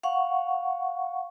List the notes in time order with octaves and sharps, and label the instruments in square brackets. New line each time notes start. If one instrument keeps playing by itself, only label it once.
[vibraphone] F5 F#5 C#6